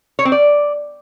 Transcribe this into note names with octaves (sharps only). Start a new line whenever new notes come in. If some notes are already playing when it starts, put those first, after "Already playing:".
C#5
C4
D5